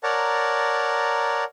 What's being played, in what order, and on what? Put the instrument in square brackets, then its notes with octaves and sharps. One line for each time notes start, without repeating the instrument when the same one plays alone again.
[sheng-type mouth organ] A#4 C#5 D5 F#5 A5 A#5